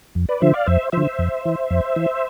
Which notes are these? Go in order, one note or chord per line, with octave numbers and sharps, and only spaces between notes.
F2
B4 D5
D3 F3 C5 E5
D5 F5
F2 C5 E5
D3 F3 C5 E5
F2
E3
F2
E3